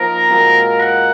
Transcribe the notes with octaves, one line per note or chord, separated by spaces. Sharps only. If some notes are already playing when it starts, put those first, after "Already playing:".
Already playing: F3 A#3 D#4 A#4
A#2 G#3 C4 F#4
F#5